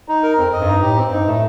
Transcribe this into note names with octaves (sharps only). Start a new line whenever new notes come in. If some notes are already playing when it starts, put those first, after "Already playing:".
D#4
A#4
F2 C4
D#5
G2
D#4
A2 G4
C4
G2
D#4
A2 A3